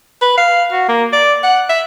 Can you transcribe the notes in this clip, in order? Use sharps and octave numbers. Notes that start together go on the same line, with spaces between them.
B4
F5
F#4
A#3
D5
F#5
E5